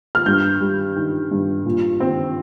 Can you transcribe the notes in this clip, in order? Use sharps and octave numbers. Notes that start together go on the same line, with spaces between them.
F6
G2 G6
G3
D#3
G2
A#2
C4